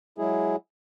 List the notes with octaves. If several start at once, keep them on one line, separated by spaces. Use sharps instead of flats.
F#3 G#3 E4 G#4